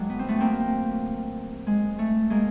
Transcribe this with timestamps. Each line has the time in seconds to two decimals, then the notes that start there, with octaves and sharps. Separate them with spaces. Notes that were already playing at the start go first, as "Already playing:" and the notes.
Already playing: G2 D3 F#3 G#3
0.09 B3
0.19 C4
0.28 A3 B3
0.40 A#3 C4
1.67 G#3
1.99 A3
2.30 G#3 A#3